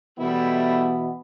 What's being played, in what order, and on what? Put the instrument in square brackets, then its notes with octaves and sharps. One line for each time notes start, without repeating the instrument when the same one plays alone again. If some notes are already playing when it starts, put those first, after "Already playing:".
[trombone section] B2 E3 B3 [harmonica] G3 A3 E4